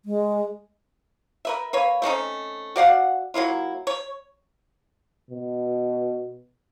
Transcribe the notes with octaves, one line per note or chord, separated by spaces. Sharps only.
G#3
A#4 B4 E5
A#3 B4 C#5
A3 C4 C#4 D#4
F#4 D5 F5 F#5
F#3 A#3 E4 F4
C#5
B2